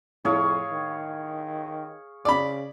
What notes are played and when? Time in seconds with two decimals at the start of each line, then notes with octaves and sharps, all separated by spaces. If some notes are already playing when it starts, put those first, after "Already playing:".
0.25 F2 A2 G#4 C#5 F5
0.72 D#3
2.25 C#3 D5 B5